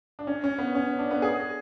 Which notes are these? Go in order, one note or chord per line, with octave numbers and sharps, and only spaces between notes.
D4
C#4
C#4
B3
C#4
D4
B3
G#4